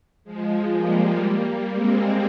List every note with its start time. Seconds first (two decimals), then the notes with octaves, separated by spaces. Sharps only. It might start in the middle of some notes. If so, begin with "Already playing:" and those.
0.24 F3 G#3
0.73 G3 A#3
1.21 G3 A#3
1.70 G#3 C4